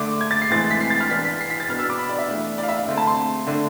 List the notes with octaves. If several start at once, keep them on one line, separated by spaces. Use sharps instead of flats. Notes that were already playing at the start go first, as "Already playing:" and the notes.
Already playing: D3 A3 D4 D6
G#6
A6
C7
A2 E3 G#3 C4 A6
B6
C7
A6
F6
E3 B3 D4 B6
B6
C7
B6
A6
B2 B3 D4 F6
E6
D6
B5
D5
E5
E3 A3 D4
D5
F5
E5
F5
D3 A3 C4
A5
C6
D3 A3 D4